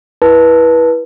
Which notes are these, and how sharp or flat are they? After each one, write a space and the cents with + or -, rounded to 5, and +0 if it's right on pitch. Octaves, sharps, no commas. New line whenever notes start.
E4 +0 B4 -25 A5 +0